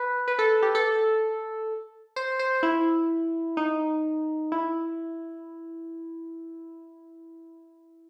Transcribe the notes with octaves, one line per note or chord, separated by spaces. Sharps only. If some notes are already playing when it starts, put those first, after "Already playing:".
Already playing: B4
B4
A4
G4
A4
C5
C5
E4
D#4
E4